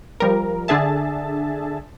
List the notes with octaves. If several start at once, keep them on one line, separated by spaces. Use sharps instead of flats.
F3 G3 A#4
D3 D4 G#4 E5 A5